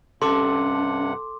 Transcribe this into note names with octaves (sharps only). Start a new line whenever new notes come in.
G2 C3 C#4 A4 F#5 C6 D6